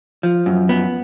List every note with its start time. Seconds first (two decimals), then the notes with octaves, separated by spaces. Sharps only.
0.23 F3
0.46 F#2
0.69 B3